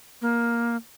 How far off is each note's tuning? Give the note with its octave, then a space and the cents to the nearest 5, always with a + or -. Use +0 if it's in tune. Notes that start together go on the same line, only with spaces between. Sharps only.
A#3 +10